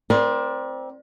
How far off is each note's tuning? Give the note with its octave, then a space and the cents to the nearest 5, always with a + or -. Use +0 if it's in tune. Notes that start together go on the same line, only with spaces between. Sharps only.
C4 +0 A#4 +40 D5 +5